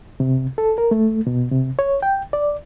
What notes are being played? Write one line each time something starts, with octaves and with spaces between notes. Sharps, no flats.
C3
A4
A#4
A3
B2
C3
C#5
G5
D5